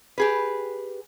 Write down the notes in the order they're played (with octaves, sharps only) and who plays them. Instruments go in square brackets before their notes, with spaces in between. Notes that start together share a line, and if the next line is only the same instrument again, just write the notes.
[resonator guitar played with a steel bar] G4 G#4 B4